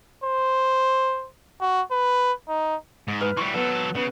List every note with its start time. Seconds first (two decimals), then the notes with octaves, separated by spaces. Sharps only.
0.24 C5
1.61 F#4
1.91 B4
2.49 D#4
3.08 G#2
3.21 B4 F6
3.37 E3 G3 C#6
3.54 F#3 B3 A4
3.95 C#3 B3